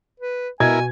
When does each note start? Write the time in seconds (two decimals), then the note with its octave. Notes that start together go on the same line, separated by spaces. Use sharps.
0.20 B4
0.60 B2 E4 A#4 G#5 G#6